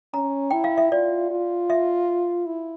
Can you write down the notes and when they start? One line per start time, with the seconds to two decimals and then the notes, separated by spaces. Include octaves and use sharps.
0.14 C#4 A#5
0.51 E4 G5
0.64 F5
0.78 E5
0.92 F4 D5
1.31 F4
1.70 E5
2.46 E4